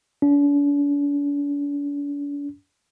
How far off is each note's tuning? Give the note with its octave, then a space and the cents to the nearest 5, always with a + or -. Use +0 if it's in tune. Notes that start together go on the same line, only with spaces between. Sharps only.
D4 -45